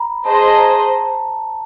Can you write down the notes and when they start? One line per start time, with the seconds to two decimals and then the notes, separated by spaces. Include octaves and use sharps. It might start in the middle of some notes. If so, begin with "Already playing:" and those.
Already playing: A#5 B5
0.25 G#4 C5 D#5 A5
0.47 A5
0.58 A#5